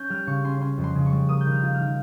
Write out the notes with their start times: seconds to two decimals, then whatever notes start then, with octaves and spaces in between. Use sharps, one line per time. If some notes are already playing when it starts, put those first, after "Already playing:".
Already playing: C#4 G6
0.10 G3 F6
0.27 C#3 C#6
0.44 C#4 C6
0.61 C#4 C6
0.78 F2
0.84 C6
0.95 C#3
1.06 C#6
1.12 G3
1.29 A#3 D#6
1.41 G6
1.46 D#3 F6
1.63 F4
1.74 F6
1.80 D#3